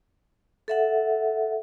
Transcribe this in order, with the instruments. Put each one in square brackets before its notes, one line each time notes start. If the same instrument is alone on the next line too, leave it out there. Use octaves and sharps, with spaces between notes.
[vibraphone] A4 E5 F#5